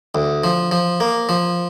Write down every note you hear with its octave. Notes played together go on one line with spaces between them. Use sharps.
D2
F3
F3
A#3
F3